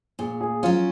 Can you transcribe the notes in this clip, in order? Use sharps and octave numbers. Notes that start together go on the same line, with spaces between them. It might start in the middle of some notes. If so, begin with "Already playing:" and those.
A#2 G#4
G#4
F#3 C#4 F4